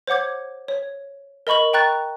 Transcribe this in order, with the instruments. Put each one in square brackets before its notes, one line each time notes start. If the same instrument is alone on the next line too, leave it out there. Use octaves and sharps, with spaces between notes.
[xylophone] C5 C#5 F#5 D6 G#6
C#5
A#4 D#5 B5 C#6 F#7
G5 A#5 C#6 F#6 A6